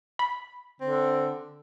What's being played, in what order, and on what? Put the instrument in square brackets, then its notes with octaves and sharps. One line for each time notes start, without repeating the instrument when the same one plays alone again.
[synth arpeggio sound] B5
[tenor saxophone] D3 [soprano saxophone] C4